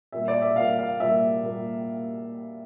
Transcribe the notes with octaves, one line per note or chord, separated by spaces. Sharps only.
A#2 G3 A#3 E5
D5
E5
A#2 G3 A#3 F5
F5
A#2 G3 A#3 E5
A#2 G3 A#3